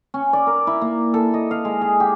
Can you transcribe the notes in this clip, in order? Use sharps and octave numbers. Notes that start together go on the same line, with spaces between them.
C#4
D5
A#4
E4
A#3
A4
D#5
F5
G#3
G#4
G4